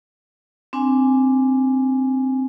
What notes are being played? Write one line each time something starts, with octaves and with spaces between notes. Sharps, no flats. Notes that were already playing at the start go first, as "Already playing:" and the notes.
C4 D4 G#5